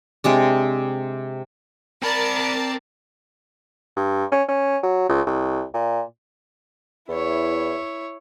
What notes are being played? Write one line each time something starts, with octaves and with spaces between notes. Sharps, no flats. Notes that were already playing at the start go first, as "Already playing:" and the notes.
C3 G#3 D4
C4 A#4 D5 A5 B5
G2
C#4
C#4
F#3
C#2
C2
A#2
E2 E4 C#5